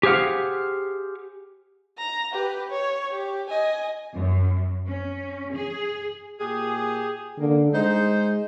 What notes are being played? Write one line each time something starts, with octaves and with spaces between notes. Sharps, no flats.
G4 G#4 C5 F5 F#5
A#5
G4 B4
C#5
G4
D#5 G#5
F#2
C#4
G#4
A#2 G4 G#4
D3 A#3
G#3 D#4 C5